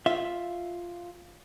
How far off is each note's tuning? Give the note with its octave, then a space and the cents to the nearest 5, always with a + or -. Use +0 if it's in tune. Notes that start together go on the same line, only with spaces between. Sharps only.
F4 +0 E5 +0